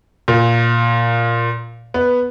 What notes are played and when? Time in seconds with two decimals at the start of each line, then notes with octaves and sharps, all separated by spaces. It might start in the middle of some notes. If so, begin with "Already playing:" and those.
0.28 A#2
1.94 B3